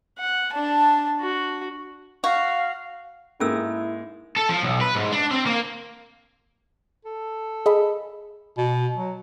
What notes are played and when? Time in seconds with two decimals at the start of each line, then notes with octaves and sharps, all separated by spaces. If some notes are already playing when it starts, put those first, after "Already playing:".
0.19 F#5
0.53 D4 A5
1.20 F#4
2.24 F#4 F5
3.40 G#2 A#3 C#4 E4 G#4 A4 E6
4.37 A4
4.49 F3
4.62 B1
4.81 B4
4.95 G#2
5.12 D4
5.31 C4
5.46 A#3
7.05 A4
7.66 G#4 D#5 B5
8.57 B2
8.96 F#3